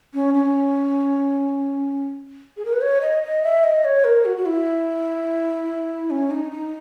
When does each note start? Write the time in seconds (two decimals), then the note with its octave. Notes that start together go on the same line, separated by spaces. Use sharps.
0.14 C#4
0.34 C#4
2.57 G#4
2.65 A#4
2.73 B4
2.81 C#5
3.01 D#5
3.22 D#5
3.43 E5
3.64 D#5
3.84 C#5
4.04 A#4
4.25 F#4
4.37 F#4
4.46 E4
6.10 C#4
6.31 D#4
6.51 D#4